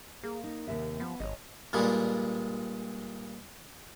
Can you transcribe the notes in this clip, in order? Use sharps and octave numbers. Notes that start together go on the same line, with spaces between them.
A#3 G#4
D#4
D#2 C3 E5
F3 B3
G#1 C#5 D#5
G2 A#2 G3 G#3